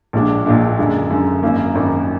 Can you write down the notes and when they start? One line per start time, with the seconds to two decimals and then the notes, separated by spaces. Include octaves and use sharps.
0.13 A#1 A#2 G#3 D4
0.46 A#1 A#2 G#3 D4
0.78 F#2 D3 G#3
1.10 F#2 D3 G#3
1.43 G#1 F#2 D#3 A#3
1.75 G#1 F#2 D#3 A#3